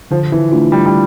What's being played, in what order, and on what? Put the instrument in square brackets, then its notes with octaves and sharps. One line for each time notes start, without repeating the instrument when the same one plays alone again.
[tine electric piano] D3 [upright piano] F3
[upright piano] E3
[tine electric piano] A3 D4 F4
[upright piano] G3
G3